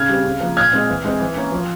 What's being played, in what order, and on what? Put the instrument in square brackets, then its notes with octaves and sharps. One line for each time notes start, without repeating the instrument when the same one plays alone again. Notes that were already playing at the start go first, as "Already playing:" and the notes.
Already playing: [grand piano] C#3 F6 G#6
G3 C4
C#3
F3 A#3
A#2 F6 G#6
G#3 C4
E3
G#3 C4
E3
A#3 C#4
F3